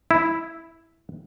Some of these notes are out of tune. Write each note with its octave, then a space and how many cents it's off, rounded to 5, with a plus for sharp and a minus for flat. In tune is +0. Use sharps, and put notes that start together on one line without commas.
E4 -5